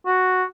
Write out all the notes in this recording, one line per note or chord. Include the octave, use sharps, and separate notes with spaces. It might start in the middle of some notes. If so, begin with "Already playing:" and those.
F#4